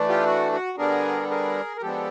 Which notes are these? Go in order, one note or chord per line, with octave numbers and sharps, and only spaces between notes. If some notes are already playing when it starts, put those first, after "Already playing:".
Already playing: E3 A3 D4
F4 G4
F#4
F#4
D3 G3 B3 D4 G#4 A#4
A4
G#4 A#4
A#4
F3 G#3 B3 D4 G4 A4